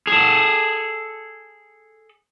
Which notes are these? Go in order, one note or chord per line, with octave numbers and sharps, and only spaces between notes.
G#4 A4